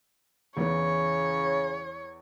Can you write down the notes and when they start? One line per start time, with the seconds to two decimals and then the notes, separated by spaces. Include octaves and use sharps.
0.57 E2 C#3 E3 C#5